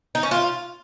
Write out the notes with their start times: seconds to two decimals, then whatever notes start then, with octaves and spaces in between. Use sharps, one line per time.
0.15 D#4
0.23 C#4
0.31 F4